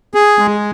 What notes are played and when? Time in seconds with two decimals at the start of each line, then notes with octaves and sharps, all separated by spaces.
0.14 G#4
0.39 G#3